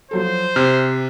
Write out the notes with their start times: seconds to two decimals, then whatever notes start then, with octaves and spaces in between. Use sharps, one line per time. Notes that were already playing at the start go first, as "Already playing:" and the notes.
0.11 F3 F#3 A4 C5
0.56 C3 F6